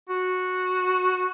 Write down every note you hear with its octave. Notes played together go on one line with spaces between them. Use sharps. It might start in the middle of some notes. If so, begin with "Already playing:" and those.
F#4